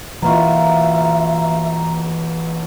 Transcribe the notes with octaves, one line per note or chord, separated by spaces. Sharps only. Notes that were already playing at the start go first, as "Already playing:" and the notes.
B2 E3 A#3 F4 E5 A#5 C#6